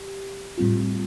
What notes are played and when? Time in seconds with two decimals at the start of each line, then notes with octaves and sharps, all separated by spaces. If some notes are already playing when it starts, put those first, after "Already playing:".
Already playing: G4
0.58 A2 G3 C4 F4